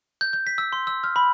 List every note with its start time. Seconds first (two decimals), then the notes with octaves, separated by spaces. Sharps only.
0.21 G6
0.33 G6
0.47 B6
0.58 E6
0.73 C6
0.87 E6
1.04 F6
1.16 B5